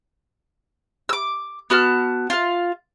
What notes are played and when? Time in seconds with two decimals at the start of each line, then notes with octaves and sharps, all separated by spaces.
1.09 D6 E6
1.70 B3 F#4 A5 F6
2.30 F4 F5